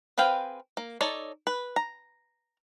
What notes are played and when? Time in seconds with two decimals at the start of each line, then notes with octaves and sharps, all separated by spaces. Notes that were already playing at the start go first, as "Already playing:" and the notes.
0.18 C4 G#4 B4 F5 G5
0.77 A#3
1.01 D#4 A4 C#5 D5
1.47 B4
1.76 A#5